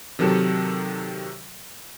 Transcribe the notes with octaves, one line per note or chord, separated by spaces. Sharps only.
C3 D#3 F#3 A4